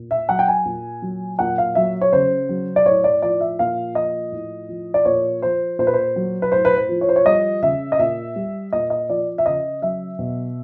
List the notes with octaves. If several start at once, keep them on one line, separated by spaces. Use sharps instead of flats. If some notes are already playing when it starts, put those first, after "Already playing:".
Already playing: A#2
E5
F#3 F#5
G5
G#5
A#2
F#3
A#2 F#5
F5
F#3 E5
C#5
C#3 C5
F#3
D5
A2 C#5
D5
F3 D5
E5
A#2 F5
F3 D#5
A2
F3
D5
A#2 C#5
F3 C5
A#2 C5
B4
C5
F#3
B4
A2 C5
B4
C5
F3
C#5
C5
C#5
G3 D#5
C#3 E5
D#5
A#2 E5
G3
A#2 D#5
D#5
F3 D5
E5
C#3 D#5
F#3 E5
B2